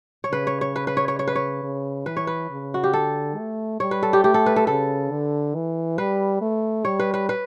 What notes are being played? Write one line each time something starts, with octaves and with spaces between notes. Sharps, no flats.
C#5
C#3 B4
C#5
C#5
B4
B4
C#5
C#5
C#5
B4
C#5
C#3
E3 B4
C#5
B4
C#3
F#4
G4
D3 A4
A3
G3 C#5
B4
A4
G4
A3 G4
A4
B4
A4
C#3 A4
D3
E3
G3 B4
A3
G3 C#5
B4
B4
B4